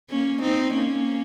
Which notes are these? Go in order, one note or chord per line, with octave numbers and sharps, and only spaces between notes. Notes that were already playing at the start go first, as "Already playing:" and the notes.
A#3 C#4
C4 D#4
A#3 C#4